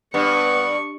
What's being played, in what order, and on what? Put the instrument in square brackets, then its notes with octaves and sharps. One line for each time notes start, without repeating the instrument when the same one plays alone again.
[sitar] G2 [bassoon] B3 [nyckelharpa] C#6